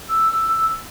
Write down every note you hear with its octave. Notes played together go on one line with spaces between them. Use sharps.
E6